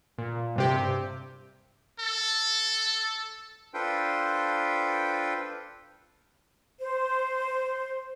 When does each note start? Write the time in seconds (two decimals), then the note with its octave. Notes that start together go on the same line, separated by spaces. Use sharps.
0.18 A#2
0.56 G2 C3 G4
2.00 A4
3.74 D4 F4 A4 B4 C5 G5
6.79 C5